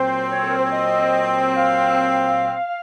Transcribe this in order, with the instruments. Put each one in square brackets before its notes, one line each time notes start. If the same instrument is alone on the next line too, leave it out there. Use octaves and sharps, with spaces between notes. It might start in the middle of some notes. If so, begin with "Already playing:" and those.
Already playing: [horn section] A#2 F#3 C4 [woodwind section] C5
[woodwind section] C#5
A4
A#4
C5
C#5
D#5
F5